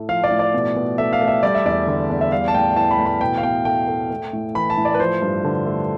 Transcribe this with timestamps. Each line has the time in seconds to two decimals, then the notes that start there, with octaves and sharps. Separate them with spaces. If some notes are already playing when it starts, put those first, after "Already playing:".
Already playing: A2 A3
0.09 F3 F5
0.24 D5
0.31 A2
0.39 D5
0.54 B2
0.76 B2
0.98 A3 E5
1.13 F5
1.21 A3
1.28 E5
1.43 G3 D5
1.55 E5
1.65 E2 D5
1.87 D3
2.10 E2
2.21 E5
2.32 G3 F5
2.48 A5
2.54 A2 G5
2.76 E3 A5
2.91 B5
2.99 A2
3.06 B5
3.21 B2 G5
3.38 F5
3.43 B2 G5
3.65 A3 G5
3.88 A3
4.10 A3
4.33 A2
4.55 E3 B5
4.70 A5
4.77 A2
4.85 D5
4.94 B4
5.00 F3 C5
5.22 G2
5.44 D3
5.66 A3